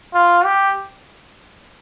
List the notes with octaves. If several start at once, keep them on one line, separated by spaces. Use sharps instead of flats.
F4
G4